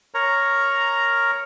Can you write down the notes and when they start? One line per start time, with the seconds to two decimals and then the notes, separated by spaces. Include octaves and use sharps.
0.14 A#4 C#5 A#5